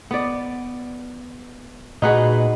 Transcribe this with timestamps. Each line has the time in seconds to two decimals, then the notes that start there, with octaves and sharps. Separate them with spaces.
0.11 B3 D5
2.02 A#2 D#4 F#4 G#4 B4